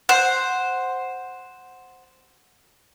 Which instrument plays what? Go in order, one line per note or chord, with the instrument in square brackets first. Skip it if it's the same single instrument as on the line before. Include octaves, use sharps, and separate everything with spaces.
[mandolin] C5 F#5